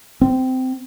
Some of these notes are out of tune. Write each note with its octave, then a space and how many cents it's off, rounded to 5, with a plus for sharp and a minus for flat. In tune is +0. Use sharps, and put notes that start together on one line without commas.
C4 -20